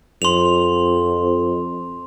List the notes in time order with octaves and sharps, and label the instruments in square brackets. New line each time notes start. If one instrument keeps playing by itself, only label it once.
[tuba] F2 [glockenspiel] C6 F7